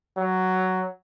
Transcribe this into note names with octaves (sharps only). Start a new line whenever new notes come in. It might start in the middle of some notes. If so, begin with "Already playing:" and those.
F#3